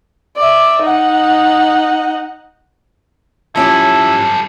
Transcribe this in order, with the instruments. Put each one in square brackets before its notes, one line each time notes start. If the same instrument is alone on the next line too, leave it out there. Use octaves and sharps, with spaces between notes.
[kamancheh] D5 E5
D#4 F#5
[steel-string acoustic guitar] F3 C#4 G4 [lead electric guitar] G3 A4 [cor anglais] E4